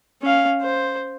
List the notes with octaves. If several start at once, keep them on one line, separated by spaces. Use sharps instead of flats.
C#4 F5
C5